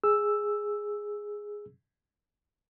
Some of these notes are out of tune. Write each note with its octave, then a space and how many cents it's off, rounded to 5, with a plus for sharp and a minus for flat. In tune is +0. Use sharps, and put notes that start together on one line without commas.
G#4 +0 E6 +0